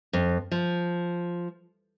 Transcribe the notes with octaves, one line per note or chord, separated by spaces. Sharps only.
F2
F3